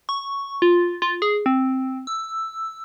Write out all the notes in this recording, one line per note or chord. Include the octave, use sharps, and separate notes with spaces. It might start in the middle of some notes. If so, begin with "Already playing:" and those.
C#6
F4
F4
G#4
C4
E6